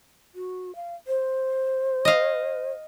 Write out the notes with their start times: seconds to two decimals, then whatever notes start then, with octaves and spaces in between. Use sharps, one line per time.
0.35 F#4
0.76 F5
1.07 C5
2.05 D#5 F5